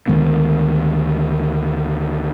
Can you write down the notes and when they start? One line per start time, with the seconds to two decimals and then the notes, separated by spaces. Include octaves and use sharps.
0.08 D2 D#3 G#3 B3